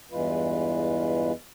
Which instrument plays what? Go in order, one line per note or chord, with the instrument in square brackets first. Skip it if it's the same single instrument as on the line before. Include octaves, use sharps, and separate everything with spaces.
[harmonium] E2 G2 E3 G#3 F4 B4